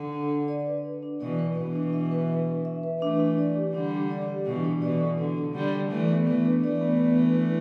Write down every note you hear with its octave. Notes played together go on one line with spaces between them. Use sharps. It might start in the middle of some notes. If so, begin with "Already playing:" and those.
Already playing: D3 A4
D4
D4
D5
B4
D4
D4
B2 E3 D5
B4
B2 E3 D4
D4
E5
B4
D4
D4
E5
B4
E3 A3 D4
D4
D5
G4
D3 G3 D4
D4
D5
G4
B2 E3 D4
D4
B2 E3 D5
A4
D3 D4
D4
D3 G3 D5
A4
E3 A3 D5
B3
E3 A3 B4
D4
E3 A3 D5
B3
B4
D4
E4